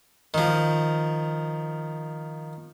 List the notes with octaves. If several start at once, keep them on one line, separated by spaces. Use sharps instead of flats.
D#3 F3